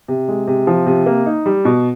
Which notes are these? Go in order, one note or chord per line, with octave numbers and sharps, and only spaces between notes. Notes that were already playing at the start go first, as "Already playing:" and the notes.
C3
G#3
C3
F3
C3
A#3
D#4
G3
B2